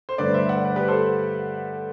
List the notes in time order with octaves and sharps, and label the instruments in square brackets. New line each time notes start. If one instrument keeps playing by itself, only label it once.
[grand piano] C5
G2 D3 A3 B4 D5
C5 E5
D5 F#5
B4 D5
G4 B4
A4 C5